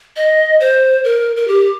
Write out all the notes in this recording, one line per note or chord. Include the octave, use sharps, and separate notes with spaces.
D#5
C5
A#4
A#4
G4